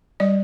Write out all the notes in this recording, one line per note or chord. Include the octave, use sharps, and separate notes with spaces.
G3 D5